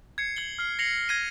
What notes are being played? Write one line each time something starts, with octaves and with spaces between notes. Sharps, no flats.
G#6 C7 C#7
G#6 F#7 G7
F6 C7 G7
A#6 C7 C#7 F7 F#7
G#6 A#6 D#7